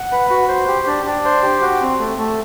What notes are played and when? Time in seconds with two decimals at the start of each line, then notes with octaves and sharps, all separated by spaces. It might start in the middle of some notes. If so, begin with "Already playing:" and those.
Already playing: F#5
0.12 B4
0.30 F#4
0.48 C5
0.67 G4
0.87 D4
1.05 D4
1.25 C5
1.43 G4
1.61 F#4
1.81 C4
1.99 A3
2.18 A3